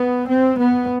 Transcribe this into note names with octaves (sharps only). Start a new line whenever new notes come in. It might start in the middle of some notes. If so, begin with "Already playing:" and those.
Already playing: B3
C4
B3